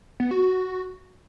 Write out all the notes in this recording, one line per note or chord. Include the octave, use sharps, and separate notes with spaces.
B3
F#4
F#4